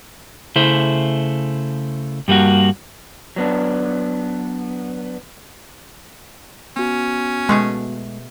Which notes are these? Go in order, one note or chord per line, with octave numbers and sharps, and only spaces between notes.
C#3 A3 E4 C5
G2 G3 A#3 F#4
F#3 B3 D4
B3 C#4 F#4
B2 G#3 A3 G#4